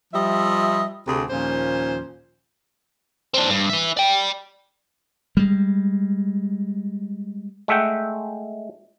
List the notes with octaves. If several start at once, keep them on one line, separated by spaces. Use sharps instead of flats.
F3 G3 D#5 E5
D2 C3 G#4
D#2 A#2 F3 C#4 C5
C4 D4
G2
B4 E5
D5 G5
G3 G#3
G#3 A3 E5 F#5 G5